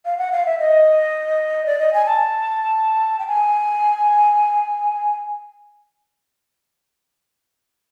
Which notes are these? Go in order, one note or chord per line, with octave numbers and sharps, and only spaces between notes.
F5
F#5
F5
E5
D#5
D5
D#5
G#5
A5
G5
G#5